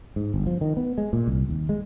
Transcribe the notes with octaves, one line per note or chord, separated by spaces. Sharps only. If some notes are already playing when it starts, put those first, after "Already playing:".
G#2
G1
F3
D#3
B3
G#3
A#2
C2
D#2
G#3